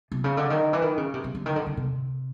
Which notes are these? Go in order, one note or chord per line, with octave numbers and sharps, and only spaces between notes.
C3
C#3
D3
D#3
E3
D#3
C#3
C3
C3
D3
D#3
D3
D3
C3